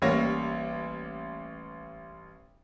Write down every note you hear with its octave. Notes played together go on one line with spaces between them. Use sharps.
A1 G3 A#3 C#5 A#6